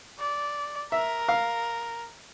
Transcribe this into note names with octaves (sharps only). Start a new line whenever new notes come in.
D5
A#4 E5
F5